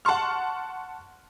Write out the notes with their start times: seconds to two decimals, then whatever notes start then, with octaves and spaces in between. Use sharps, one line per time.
0.05 F#5 A5 C6 C#6 F6